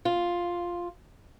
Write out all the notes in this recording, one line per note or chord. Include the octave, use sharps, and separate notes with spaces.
F4